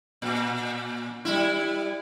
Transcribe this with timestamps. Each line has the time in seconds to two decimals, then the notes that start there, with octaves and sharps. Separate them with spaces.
0.22 A#2
1.25 G3 E4